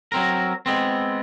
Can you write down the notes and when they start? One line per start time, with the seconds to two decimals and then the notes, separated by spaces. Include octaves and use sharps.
0.12 F#3 C4 A#4
0.66 G#3 B3 C4